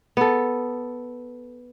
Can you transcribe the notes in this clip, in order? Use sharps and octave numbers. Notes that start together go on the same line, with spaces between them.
B3 A4